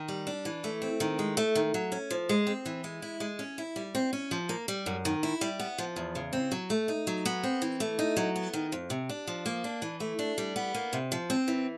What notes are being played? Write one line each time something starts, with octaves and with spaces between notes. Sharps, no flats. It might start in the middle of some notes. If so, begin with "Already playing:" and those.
Already playing: D#3
G3
D4
E3
A3
C4
D#3
G#3
A3
D#3
F#3
C#4
F3
G#3
C4
E3
G#3
E4
G#3
C#4
E4
G3
C4
C#4
F3
A#3
G3
F#2
D#3
E4
G3
B3
F3
E2
C#3
C4
F#3
A3
D#4
F#3
B3
C4
E3
A3
D#4
F#3
B3
D#3
F2
C3
D4
F3
A#3
D4
E3
A3
D4
G3
B3
A#3
C3
F3
C4
E3